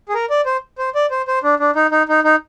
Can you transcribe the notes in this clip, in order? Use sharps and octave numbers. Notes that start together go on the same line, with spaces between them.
G#4
A#4
D5
C5
C5
D5
C5
C5
D4
D4
D#4
D#4
D#4
D#4